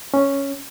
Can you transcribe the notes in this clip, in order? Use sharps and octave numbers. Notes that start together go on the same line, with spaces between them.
C#4